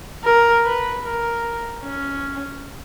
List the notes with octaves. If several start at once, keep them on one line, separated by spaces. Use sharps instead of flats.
A#4
B4
A#4
C#4